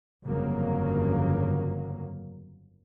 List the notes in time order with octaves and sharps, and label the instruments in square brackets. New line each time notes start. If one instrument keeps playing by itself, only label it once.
[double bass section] G1 F2 C#3 F#3 A#3